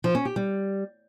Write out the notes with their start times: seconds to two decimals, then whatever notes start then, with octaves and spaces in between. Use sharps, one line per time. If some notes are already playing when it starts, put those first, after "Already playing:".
0.04 F3
0.15 C#4
0.25 G4
0.36 G3